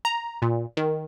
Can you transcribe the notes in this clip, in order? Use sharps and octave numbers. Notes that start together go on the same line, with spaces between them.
A#5
A#2
D#3